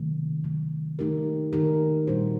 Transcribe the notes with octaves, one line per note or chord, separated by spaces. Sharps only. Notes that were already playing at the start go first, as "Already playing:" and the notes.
Already playing: C3 D#3 F#3 A3
C3 D#3 F#3 A3
D#3 A3 D#4 G4 A#4
D#3 A3 D#4 G4 A#4
A#2 G3 D4 F#4 C5